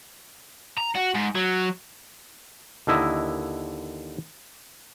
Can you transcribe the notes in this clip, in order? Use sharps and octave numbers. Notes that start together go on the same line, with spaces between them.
A#5
F#4
G#2
F#3
D#2 D3 E4 D#5 A#5